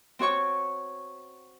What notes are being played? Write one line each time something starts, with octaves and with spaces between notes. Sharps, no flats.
C4 F#4 C#5 C#6